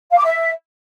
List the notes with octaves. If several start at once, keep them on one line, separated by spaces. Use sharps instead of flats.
F5
D6
E5